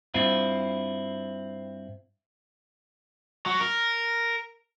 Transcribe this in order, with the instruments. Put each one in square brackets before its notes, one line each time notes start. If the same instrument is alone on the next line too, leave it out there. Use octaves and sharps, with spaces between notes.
[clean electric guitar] G2 C4 E4 F4
[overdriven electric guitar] F#3
A#4